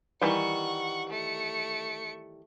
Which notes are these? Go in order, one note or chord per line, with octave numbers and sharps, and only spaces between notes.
D#3 E3 G3 F#5 C#6
A3 C#7